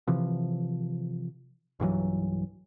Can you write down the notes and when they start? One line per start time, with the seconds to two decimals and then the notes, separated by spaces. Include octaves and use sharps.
0.08 C3 E3 F3
1.80 B1 G2 E3 F#3